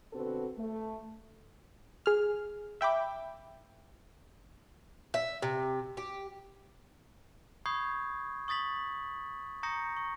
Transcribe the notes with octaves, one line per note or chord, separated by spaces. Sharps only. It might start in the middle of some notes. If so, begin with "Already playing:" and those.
B2 D3 C4 F#4 A4 B4
A3
G#4 F6
E5 G5 B5 D6
E5
C3
G4
B5 C#6 D#6 G6 G#6 C7
C#6 D#6 A6 B6 F#7
A#5 C#6 D#6 G6 A#6 C#7
C#6